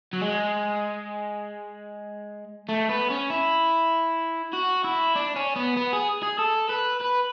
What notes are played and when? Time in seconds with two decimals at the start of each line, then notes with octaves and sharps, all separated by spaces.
0.13 F#3
0.22 G#3
2.69 A3
2.89 B3
3.10 C#4
3.30 E4
4.53 F#4
4.84 E4
5.15 D4
5.36 C#4
5.56 B3
5.77 B3
5.93 G#4
6.23 G#4
6.38 A4
6.69 B4
7.00 B4